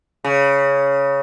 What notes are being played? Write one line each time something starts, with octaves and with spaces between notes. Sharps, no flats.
C#3